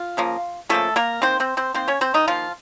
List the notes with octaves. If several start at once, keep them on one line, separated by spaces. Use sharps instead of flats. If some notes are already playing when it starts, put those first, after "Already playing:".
Already playing: F4
C#3 F3 A#3
C#3 F3 A3 A#3 A4
A#3 A#4
D#3 A#3 C4 C5
C4 C5
C4 C5
D#3 A#3 C4 C5
C#4 C#5
C4 C5
D#3 D#4
D#3 F3 A#3 F4